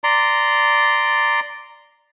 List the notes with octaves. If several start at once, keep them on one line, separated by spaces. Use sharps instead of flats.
D5 A#5 C6